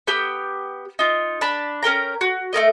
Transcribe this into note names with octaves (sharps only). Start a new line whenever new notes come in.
B3 G4 G5 E6
D#4 F4
D4 A5 B5
C#4 A#4 G5 A#5
F#4
A3 F4 A#4 D#5